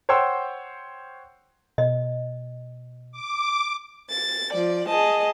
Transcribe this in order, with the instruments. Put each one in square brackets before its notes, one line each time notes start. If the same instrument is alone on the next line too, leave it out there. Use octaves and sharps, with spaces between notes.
[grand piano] C5 C#5 F#5 G5 C6 E6
[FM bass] B2 [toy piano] D#5
[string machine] D6
[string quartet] A6
F3 D5
G#4 D#5 A5